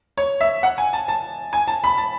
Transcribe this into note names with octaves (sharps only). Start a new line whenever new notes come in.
C#5
E5
F#5
G#5
A5
A5
G#5
A5
B5
A5